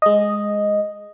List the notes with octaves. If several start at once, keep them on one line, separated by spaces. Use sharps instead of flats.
G#3 D#5